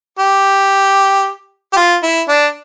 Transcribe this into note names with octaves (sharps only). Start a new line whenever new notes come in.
G4
G4
F4
E4
D4